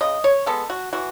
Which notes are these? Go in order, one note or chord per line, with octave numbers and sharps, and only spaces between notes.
C#3 D#5
C#5
G#3 B3 A4
F#4
E3 F#4